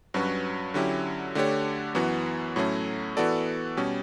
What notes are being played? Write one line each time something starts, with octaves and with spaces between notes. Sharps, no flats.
G2 F#3 C#4 F#4 B4
D3 F#3 C#4 E4 G4
D3 A3 D4 G4 C#5
F#2 E3 B3 F#4
A2 F#3 A3 C#4
E3 B3 F#4 A4 D5
B2 G3 C#4